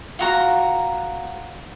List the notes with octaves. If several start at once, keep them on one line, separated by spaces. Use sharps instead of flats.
F4 F#4 A#5